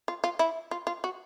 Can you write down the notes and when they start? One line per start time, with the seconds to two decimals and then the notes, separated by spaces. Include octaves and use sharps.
0.08 F4
0.24 F4
0.39 E4
0.71 F4
0.87 F4
1.04 F#4